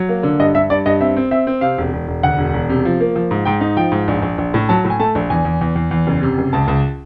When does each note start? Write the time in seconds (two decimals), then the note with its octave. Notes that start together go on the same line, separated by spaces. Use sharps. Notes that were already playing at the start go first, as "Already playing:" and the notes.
Already playing: F#3
0.09 A#3
0.23 D3
0.39 G2 D#5
0.54 G2 E5
0.70 G2 D5
0.86 G2 D#5
1.00 C4 E5
1.16 C4
1.31 C4 E5
1.47 C4
1.61 C3 F5
1.78 E1
1.93 E1
2.08 E1
2.23 D2 F#5
2.38 E1
2.53 E1
2.69 C3
2.85 F3
3.00 A#3
3.16 F3
3.31 G#2
3.45 G#2 G5
3.61 D#4
3.77 F3 G5
3.92 G#2
4.08 A#1
4.22 A#1
4.38 A#1
4.54 A2
4.69 F#3 A5
4.84 A2
4.90 G#5
4.99 A3 A5
5.15 A#1
5.30 E2 G#5
5.45 E2
5.61 E2
5.75 E2
5.91 E2
6.07 F#1
6.22 C3
6.38 F#1
6.53 C#2 A5
6.68 C#2